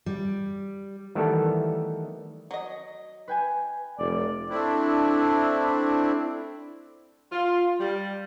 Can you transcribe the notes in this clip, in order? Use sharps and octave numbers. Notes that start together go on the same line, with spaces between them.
G3
D#3 E3 G3 A3 B3 A4
F#3 D#5
B4 G5 G#5
F1 D5
A3 C4 D4 E4
F4
G3